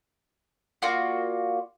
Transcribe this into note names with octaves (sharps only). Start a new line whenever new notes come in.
A#3 F4 F#4 D5